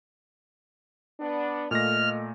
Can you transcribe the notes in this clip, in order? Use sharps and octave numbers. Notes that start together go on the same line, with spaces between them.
B3 D4
A#2 A3 F4 A4 D#5 F6 A#6